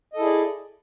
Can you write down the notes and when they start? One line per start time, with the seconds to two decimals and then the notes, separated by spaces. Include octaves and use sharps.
0.13 D#5
0.16 A4
0.19 E4
0.22 G#4
0.25 D5